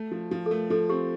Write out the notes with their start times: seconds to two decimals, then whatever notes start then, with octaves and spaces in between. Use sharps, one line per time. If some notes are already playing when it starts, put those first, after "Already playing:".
Already playing: A3
0.11 F3
0.31 F3
0.46 A4
0.51 A3 A#4
0.70 F3 A4
0.89 C4 G4